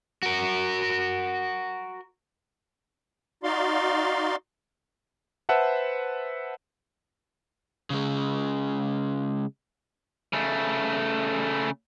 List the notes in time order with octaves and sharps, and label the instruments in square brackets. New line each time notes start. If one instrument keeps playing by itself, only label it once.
[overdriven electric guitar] F#4 A#4
[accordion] D#4 F#4 D5 F5 C6
[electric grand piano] B4 C5 E5 F#5 A5
[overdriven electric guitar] C#3 G#3
[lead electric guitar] C#3 A3